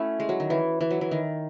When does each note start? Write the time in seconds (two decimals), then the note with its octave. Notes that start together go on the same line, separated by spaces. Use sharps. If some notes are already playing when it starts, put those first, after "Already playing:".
Already playing: A3 C#4 E4 F#4
0.20 G#3
0.29 F#3
0.40 D#3
0.50 E3
0.80 E3
0.91 F#3
1.01 E3
1.11 D#3